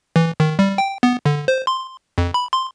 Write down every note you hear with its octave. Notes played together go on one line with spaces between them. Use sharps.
E3
D#3
G3
G5
B3
D3
C5
C6
F2
B5
C6